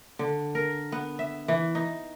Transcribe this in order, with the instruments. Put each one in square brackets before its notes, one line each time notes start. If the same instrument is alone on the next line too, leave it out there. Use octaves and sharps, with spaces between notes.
[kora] D3
A#4
B3
E5
E3
D#4